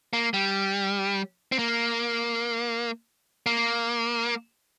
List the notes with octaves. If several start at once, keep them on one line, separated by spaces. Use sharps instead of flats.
A#3
G3
C4
A#3
A#3